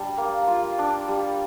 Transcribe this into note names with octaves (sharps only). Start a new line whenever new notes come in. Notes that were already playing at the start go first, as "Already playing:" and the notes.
Already playing: G3 D4
A#3
F4
D4
G3